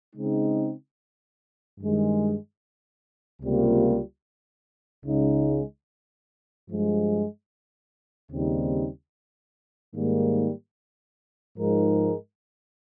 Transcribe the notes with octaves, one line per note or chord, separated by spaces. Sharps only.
C#3 G#3 C4 D#4
G2 D#3 G#3
C#2 C3 G3 A#3 F4
C#2 C#3 G#3 D#4
G2 F3 G#3
D#2 C#3 G3 C4 D#4
G#2 D#3 G3 A#3
G#2 F3 G#3 D#4 A#4